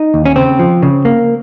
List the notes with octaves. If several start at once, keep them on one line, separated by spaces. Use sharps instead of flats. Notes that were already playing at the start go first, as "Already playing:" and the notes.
Already playing: D#4
D#2
C#4
C#3 C4
F3
C#3
A#3